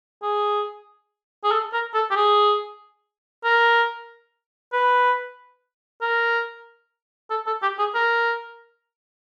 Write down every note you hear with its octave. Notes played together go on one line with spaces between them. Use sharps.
G#4
G#4
A4
A#4
A4
G4
G#4
A#4
B4
A#4
A4
A4
G4
G#4
A#4